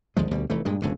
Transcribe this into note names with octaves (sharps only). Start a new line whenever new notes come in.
G#1 D2 F3 G#3
D2 B2 G3
F1 E3 A3
G2 A#2 G#3
E1 C#2 G2 D3